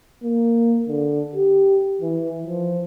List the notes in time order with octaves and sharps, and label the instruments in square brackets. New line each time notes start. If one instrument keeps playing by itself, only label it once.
[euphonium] A#3
D3
G4
E3
F3